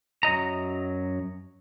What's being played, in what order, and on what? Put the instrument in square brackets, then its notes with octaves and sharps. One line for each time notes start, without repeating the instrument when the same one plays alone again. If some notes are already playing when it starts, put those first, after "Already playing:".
[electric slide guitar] F#2 F#3 D#5 A#5